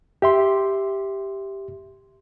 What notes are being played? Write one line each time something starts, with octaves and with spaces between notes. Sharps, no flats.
G4 E5 C6